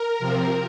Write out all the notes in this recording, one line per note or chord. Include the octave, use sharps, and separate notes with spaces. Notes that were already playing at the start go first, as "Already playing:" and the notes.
Already playing: A#4
C3 F3 C4